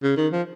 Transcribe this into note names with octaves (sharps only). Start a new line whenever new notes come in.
C#3
D#3
F3